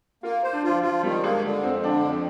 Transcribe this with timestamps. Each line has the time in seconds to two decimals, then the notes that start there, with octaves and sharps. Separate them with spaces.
0.23 A#3 F4
0.43 C5
0.53 D4
0.64 F3 F4
0.83 F3 F4
1.03 D#3 G3
1.23 G#3 A#3
1.44 D3
1.63 F2 C4
1.83 D3 D4
2.03 F2